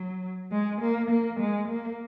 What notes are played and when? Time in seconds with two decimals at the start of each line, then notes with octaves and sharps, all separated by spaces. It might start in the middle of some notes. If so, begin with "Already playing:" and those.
Already playing: F#3
0.51 G#3
0.81 A#3
1.10 A#3
1.39 G#3
1.68 A#3